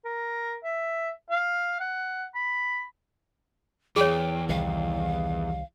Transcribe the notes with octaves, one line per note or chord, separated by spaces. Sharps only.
A#4
E5
F5
F#5
B5
E2 G#4 C#5 G5
C2 D#3 G3 F5